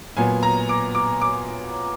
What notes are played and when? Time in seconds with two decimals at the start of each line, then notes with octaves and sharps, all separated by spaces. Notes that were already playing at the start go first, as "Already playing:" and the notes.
0.17 A#2 F#3 B3 G#5
0.43 A#5
0.69 D6
0.95 D6
1.22 D6